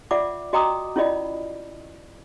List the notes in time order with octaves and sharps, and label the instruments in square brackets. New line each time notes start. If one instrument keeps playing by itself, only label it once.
[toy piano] F4 D5 E5 F#5 D6
F#4 D#5 G5 A#5 D6 D#6
C#4 E4 F4 D5 D#5 B5